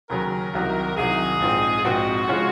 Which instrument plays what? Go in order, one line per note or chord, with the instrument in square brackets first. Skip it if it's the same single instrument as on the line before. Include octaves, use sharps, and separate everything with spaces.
[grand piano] D#2 C#3 F#3 [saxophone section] A#4
[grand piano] C2 C3 D#3 F#3
[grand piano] C2 C3 D#3 F#3 [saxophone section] G#4
[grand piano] A#1 G#2 F3 C4 D#4
[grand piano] A#1 G#2 F3 C4 D#4 [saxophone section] F#4
[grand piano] C#3 F3 G#3 C#4 F4